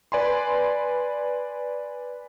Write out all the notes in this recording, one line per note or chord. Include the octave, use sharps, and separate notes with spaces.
B4 D5 G#5 B5 C6